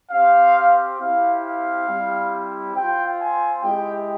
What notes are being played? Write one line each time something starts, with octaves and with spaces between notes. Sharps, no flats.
C4 G4 F5
C4 E4 G4 F5
F5
G3 C4 E4 G4
C4 F4 G5
G#5
G#3 E4 G4 G5